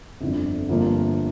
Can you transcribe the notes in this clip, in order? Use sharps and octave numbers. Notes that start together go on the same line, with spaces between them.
G1 F2 D3
G1 G2 F3 A#3